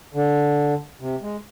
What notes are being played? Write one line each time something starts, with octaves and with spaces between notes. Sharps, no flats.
D3
C3
G#3